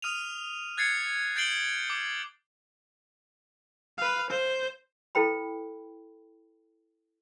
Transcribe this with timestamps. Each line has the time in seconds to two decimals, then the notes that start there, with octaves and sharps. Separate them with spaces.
0.02 D#6 F6 D#7 F7
0.77 F#6 G#6 A6 C7 C#7
1.36 G6 A6 C7 D7 F#7 G7
1.90 D6
3.98 B4 F5
4.30 C5
5.15 E4 A4 B4 G5 B5